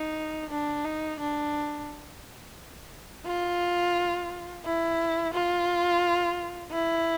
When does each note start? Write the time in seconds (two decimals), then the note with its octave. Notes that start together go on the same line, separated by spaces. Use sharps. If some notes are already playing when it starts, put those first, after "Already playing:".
Already playing: D#4
0.50 D4
0.85 D#4
1.19 D4
3.26 F4
4.65 E4
5.34 F4
6.72 E4